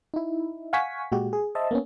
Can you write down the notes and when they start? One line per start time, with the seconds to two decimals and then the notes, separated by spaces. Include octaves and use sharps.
0.14 D#4 E4
0.73 F5 F#5 G#5 C#6 B6
1.12 A#2 G#3 F#4 G4
1.33 G#4
1.55 C5 D#5 E5 A5
1.71 A#3 B3 C#4